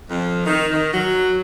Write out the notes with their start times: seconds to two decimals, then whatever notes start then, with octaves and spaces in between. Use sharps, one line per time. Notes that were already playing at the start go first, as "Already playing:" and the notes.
0.08 F2
0.45 D#3
0.72 D#3
0.92 F#3